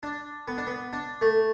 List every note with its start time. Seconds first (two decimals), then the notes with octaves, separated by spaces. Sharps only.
0.03 D4
0.48 B3
0.57 D4
0.67 B3
0.93 D4
1.21 A3